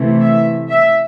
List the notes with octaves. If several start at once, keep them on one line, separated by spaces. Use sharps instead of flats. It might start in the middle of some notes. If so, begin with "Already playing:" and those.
Already playing: C3 E3 A3
E5
E5